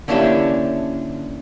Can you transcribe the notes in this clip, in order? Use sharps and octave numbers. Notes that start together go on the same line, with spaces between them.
D3 A#3 C#4 D4 E4 G4